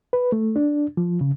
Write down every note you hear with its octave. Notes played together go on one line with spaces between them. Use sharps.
B4
A3
D4
F3
C#3